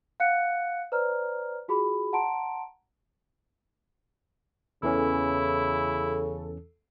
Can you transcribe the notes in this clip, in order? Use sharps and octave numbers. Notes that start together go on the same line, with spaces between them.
F5 F#5 F#6 C#7
B4 C5 D5 A#5 F6
F4 F#4 G#4 B5
F#5 A5 A#5 C6 D7
E2 C#3 E3 C#4 E4 A4